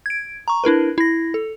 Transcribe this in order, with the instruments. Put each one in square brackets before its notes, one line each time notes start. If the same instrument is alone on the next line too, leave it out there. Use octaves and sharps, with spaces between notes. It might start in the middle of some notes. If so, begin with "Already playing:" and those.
[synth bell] G#6 D7
A#5 C#6
D4 E4 A#4 B4
E4 A#6
A4